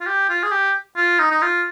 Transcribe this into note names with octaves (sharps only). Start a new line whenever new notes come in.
F4
G4
F4
G#4
G4
F4
D#4
D#4
F4